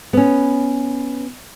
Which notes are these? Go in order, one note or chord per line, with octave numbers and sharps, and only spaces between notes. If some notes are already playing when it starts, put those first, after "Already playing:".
B3 C#4